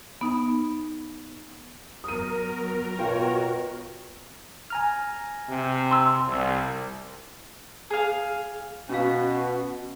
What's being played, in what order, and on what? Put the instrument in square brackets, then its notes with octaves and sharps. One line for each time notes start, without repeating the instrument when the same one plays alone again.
[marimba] B3 D#4
[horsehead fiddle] F#3 B3 [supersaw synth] A#4 [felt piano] D#6 D#7
[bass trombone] B2 [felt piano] F4 G5 [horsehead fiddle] F#4 C#5
[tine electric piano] G#5 A#5 F6
[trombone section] C3
[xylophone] C6 E6
[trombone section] C2
[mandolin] G#4 F5
[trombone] B2 [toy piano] C#4 F5 [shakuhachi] F#4